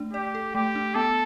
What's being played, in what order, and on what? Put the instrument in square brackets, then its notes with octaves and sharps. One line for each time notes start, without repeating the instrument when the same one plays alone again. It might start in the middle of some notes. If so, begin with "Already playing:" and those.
Already playing: [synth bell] A3 D4 D5
[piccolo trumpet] G4 [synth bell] D5
[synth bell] A4
[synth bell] A3 [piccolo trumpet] G4
[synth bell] D4
[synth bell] B3 [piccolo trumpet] A4